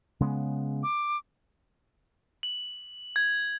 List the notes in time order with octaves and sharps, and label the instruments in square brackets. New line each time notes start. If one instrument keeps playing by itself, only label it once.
[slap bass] C#3 G#3 B3
[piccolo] D6
[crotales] F#7
G#6